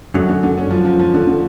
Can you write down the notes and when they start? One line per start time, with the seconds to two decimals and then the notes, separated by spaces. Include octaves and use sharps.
0.14 F#2 D3 F#3
0.29 D3
0.43 D3
0.58 C#4
0.71 F3
0.85 F3
0.99 F3
1.14 D3
1.27 D3